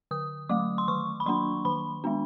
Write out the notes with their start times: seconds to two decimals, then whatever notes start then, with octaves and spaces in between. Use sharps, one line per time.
0.11 D3 D#6
0.49 F#3 A3 D6
0.78 C6
0.88 D#3 C#6
1.20 B5
1.26 F#3 A#3 D4 C6
1.65 D#3 B5
2.04 G#3 B3 D4